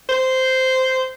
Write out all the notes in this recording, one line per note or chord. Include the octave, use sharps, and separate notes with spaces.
C5